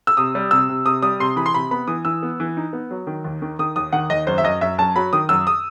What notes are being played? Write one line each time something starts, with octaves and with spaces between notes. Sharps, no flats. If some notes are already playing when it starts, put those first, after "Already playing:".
E6
C3 D#6
G3
C3 E6
C3
C3 D#6
G3 D#6
C3 C6
E3 B5
C6
C3 B5
B3 B5
E3 D#6
E3 E6
B3
E3
D#4
B3
F#3
D#3
D#2
D#3
D#3 D#6
D#2 D#6
D#3 F#5
D#2 D#5
F#2 C5
E5
F#2 D#5
F#2 E5
F#2 A5
F#3 B5
D#3 D#6
F#2 E6
D#6